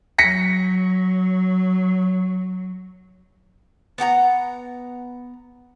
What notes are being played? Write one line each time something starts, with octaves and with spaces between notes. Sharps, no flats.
F#3 A#6 B6 C#7
B3 F#5 G5 A#5